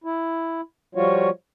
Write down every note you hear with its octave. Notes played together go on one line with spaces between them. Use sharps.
E4
F3 G3 F4 F#4 C#5